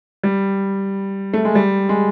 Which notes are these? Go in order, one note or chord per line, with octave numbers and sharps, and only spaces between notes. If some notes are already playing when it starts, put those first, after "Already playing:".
G3
A3
G#3
G3
G#3